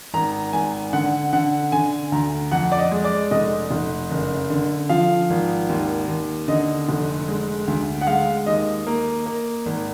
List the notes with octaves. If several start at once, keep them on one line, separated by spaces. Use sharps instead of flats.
G#1 A#5
G#1 G#5
D3 F#5
D3 F#5
D3 G#5
D2 A#5
F2 F#5
D5
D#5
G#3
D5
F1 D#5
F1
F#1
D3
F3 F5
G#1
D#2
D#2
D3 D#5
F1
G#3
D2
F#5
G#3 F5
D#2 D#5
A#3
A#3
G#1